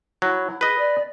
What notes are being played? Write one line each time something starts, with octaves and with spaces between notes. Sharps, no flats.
F#3 E4
E4
G#4 B4 D#5
D5